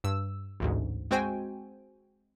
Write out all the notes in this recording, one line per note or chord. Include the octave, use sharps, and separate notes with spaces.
G2 E6
A1 D2 G#2
G#3 C4 F#4 C5 G5 G#5